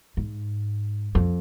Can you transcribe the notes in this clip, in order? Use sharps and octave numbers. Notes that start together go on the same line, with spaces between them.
G#2
F2